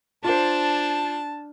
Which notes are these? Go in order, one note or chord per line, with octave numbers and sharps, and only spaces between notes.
D4 F4 C5 A5